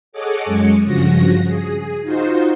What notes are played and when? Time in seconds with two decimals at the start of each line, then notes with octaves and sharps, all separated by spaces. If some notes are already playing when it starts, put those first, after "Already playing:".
0.12 G#4 A4 C#5 D#5 F#5 D6
0.45 F#2 G#3 C#7
0.84 G2 C#3 F3 F#4 A#6
1.44 G#4
2.02 D#4 F4 F#4 C5